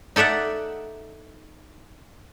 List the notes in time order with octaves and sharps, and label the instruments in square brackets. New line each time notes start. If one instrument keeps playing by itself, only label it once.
[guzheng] D#4 A4 D5 E5 F#5